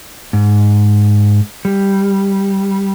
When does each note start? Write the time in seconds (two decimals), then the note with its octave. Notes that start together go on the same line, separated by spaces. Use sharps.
0.33 G#2
1.65 G3